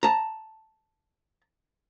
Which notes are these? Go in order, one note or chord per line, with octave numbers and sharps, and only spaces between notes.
A5 A#5